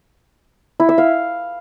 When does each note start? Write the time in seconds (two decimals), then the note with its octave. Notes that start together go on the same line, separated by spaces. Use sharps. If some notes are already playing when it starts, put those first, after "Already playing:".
0.80 E4
0.89 E5
0.98 F5